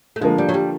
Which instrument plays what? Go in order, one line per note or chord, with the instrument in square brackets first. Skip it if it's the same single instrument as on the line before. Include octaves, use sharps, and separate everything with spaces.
[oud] A3
[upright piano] D3 F3 A#3 [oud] G#3
[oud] G3
F#3
G3